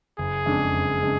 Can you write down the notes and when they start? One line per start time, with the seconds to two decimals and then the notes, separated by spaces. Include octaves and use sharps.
0.18 F#1 G#4
0.46 F2 C#3 G#3 D4
0.73 F#1
1.01 C#3 G#3 D4